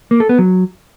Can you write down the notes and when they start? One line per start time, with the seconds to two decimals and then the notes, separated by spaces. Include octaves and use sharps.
0.11 A#3
0.20 A4
0.29 B3
0.39 F#3